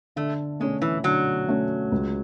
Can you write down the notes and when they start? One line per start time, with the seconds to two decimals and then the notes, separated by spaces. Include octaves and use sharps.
0.16 D3 A3
0.60 G#3 A3 C#4
0.82 E3
1.04 D3 F#3
1.48 A3 C#4
1.92 C#2